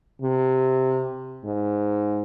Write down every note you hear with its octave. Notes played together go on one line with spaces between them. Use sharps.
C3
G#2